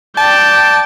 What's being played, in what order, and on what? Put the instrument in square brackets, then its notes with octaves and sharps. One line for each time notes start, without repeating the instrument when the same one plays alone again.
[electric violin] D5 G5 [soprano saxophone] A5